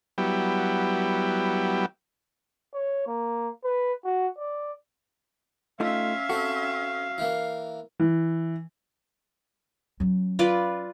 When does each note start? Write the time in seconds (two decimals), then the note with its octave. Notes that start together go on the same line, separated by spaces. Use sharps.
0.18 F#3 G3 B3 E4 G4
2.74 C#5
3.07 A#3
3.64 B4
4.05 F#4
4.39 D5
5.80 A3 C#4 D#4 F4 E5 F5
6.29 C4 F#4 A4
7.18 E3 A#3
7.99 E3
10.00 F#3 C#4
10.39 F4 B4 D5